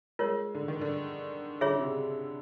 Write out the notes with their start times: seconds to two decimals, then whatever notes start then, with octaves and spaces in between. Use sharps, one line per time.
0.19 G#3 F4 A#4 C#5
0.55 D3
0.68 D#3
0.81 D3
1.61 D3 F4 G#4 C#5 E5
1.70 C#3
1.78 C3
1.88 C#3